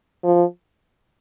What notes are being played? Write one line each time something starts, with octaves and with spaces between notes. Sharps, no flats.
F3